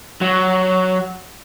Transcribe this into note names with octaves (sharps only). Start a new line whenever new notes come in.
F#3